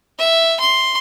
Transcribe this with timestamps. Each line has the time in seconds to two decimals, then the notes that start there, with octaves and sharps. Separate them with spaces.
0.19 E5
0.61 C6